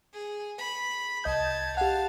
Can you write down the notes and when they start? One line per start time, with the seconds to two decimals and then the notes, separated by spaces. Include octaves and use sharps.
0.14 G#4
0.58 B5
1.24 C2 D#5 A5 G6 G#6
1.77 G4 F5 F#5 A5